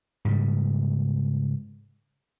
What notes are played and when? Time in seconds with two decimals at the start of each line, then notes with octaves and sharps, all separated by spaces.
0.25 G#2 C#3 G3